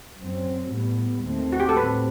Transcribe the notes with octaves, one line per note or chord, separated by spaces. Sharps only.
F#2 F#3 C4
A2 G3 B3
D#2 D#3 A3 C4
F#4
G4
A4
A2 G3 C4 B4